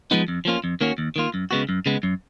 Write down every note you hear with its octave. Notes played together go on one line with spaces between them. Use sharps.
F3 G#3 B3 D#4
F2
F3 A#3 C#4 F4
F2
D#3 A#3 C#4 F#4
D#2
D#3 A#3 F4
F#2
C#3 G#3 B3 F#4
F#2
C#3 G#3 B3
F#2